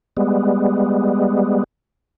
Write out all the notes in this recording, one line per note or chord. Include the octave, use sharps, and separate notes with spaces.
G3 G#3 B3